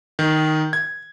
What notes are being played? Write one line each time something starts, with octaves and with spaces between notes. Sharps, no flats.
D#3
G#6